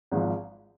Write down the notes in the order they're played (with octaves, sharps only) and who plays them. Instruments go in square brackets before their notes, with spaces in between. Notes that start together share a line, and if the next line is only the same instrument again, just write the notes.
[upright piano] G#1 G#2 F3